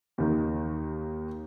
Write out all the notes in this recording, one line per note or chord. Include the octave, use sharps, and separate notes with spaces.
D#2 D#3